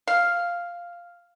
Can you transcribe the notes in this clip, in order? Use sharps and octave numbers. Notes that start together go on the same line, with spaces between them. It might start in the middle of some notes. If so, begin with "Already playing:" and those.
F5